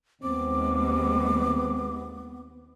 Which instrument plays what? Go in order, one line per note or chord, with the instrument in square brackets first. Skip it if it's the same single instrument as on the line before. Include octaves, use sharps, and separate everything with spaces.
[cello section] D#2 G#3 [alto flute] B3 [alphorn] C4 [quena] D6